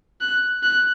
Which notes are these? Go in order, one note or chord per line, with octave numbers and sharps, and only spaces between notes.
F#6
F#6